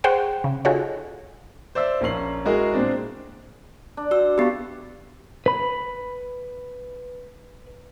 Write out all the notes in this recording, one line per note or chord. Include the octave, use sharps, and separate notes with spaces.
G#4 C5 F#5 G5 C#6
C#3
D#4 F4 F#4 G#4 A4 C#5
C5 D5 E5 E6
A#1 A#3 C#4 C7 F#7
G#3 E4 F#4 G#4 A#4 D#5
A#2 G#3 C4 D4
D4
F#4 E6
B3 E4 G4 B4
B4 B5